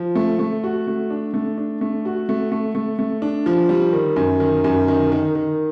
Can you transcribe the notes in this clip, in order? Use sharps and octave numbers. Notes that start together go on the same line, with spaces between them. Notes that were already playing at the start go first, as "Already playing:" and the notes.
Already playing: F3
A3
A3
F#4
A3
D4
A3
D4
A3
F#4
A3
A3
A3
A3
D4
F3
G3
D#3
F#2
D#3
F#2
D#3
D#3
D#3